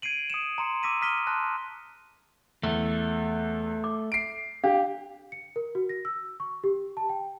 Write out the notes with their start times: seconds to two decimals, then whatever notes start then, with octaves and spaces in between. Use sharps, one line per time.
0.02 G#6 C7 D7 D#7 F#7
0.30 D#6 C#7 D7 E7
0.58 A#5 C6 C#7
0.83 D6 E6 A#6 B6 D#7
1.01 A#5 D#6 F6 B6 D#7 G7
1.27 A5 C6 F6 F#6 A#6
2.63 E2 A3
3.84 D6
4.12 C7 D7
4.64 D4 G4 F5
5.32 C#7
5.56 A#4
5.75 F#4
5.89 A#6
6.05 E6
6.40 C#6
6.64 G4
6.97 A5
7.09 G5